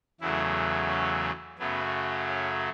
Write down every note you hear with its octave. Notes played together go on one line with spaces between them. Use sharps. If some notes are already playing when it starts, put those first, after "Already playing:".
E2 C#3 F#3 A3 E4
C#4
F#2 C#3 F#3 A3 B3
C#4